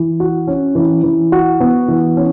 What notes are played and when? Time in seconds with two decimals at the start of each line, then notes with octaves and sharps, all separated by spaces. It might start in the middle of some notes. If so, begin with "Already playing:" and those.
Already playing: E3
0.20 F#4
0.47 C#4
0.75 E3
1.03 E3
1.32 F#4
1.60 B3
1.88 E3
2.17 C#4